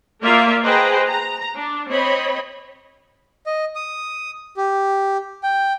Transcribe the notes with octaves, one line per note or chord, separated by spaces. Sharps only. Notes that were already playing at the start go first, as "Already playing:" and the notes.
A#3 F4 A#4 D5 E5 F5
G#4 B4 C5 D#5 G5 A#5
A#5
D4
C4 C#5 D#5 B5
D#5
D#6
G4
G5